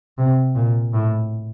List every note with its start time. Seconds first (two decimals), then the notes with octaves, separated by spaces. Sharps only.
0.18 C3
0.55 A#2
0.93 A2